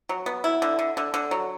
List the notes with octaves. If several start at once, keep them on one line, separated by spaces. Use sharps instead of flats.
F#3
B3
E4
D3
D3
D3
D3
F#3